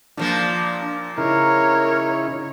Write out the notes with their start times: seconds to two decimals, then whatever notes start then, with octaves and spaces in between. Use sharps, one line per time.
0.17 A#2 F3 A#3 D4
1.18 C#3 D#4 E4 A#4 C#5